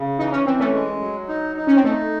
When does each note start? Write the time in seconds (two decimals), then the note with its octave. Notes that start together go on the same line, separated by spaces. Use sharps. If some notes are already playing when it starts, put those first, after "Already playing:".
Already playing: C#3
0.19 E3 D#4
0.32 C#4
0.46 E3 C4
0.60 A3 C#4
0.74 G#3
1.01 F#3
1.28 D#4
1.57 D#4
1.67 C#4
1.76 C4
1.84 A3 D#4